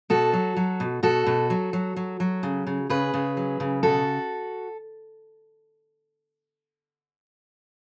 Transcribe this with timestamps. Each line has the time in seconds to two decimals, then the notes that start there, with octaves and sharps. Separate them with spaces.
0.10 B2 F#4 A4
0.33 F#3
0.57 F#3
0.80 B2
1.03 B2 F#4 A4
1.26 B2
1.50 F#3
1.73 F#3
1.96 F#3
2.20 F#3
2.43 C#3
2.67 C#3
2.90 C#3 G#4 B4
3.14 C#3
3.37 F#3
3.60 C#3
3.83 B2 F#4 A4